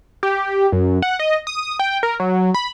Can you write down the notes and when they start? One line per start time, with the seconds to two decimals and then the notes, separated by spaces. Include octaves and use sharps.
0.23 G4
0.72 F#2
1.02 F#5
1.19 D#5
1.47 D#6
1.79 G5
2.03 A#4
2.20 F#3
2.54 B5